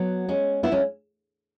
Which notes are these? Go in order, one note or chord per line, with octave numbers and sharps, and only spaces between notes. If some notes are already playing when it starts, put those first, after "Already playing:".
Already playing: F#3 B3
G#3 C#4
B3 E4
G#3 C#4